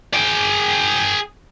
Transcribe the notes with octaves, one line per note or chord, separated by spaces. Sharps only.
G#4 G5